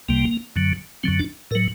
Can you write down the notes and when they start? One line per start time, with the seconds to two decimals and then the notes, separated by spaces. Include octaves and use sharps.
0.08 C2 C3 G3 A#3
0.56 F#2 D3 F#3
1.03 F#2 D3 F#3 C4
1.19 D4
1.51 A2 A#4
1.55 F#3